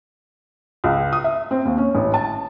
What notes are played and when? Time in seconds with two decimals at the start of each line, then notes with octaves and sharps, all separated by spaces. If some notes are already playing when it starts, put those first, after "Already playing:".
0.84 C#2
1.13 D#6
1.24 E5
1.51 C4
1.65 D#2
1.78 C#4
1.95 A1
2.14 A5